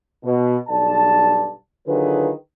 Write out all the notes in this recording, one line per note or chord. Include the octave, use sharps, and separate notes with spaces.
B2
B1 G2 D5 A5
D3 D#3 F#3 F4 G#4 B4